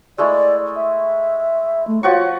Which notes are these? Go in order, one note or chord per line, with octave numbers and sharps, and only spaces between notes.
G#3 A3 E4 D5
E5
A3
F3 F#4 C#5 C#6